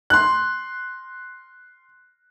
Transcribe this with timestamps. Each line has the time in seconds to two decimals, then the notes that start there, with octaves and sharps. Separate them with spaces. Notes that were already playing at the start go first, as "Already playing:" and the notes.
0.10 C6 F#6